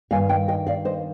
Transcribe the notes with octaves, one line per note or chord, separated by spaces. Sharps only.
G2 D#3 A#3 F5 G#5
D#5 G5
D#5 G5
D5 F5
C5 D#5